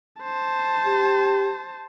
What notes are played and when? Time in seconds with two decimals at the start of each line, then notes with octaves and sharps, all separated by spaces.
0.22 C5 A5
0.85 G4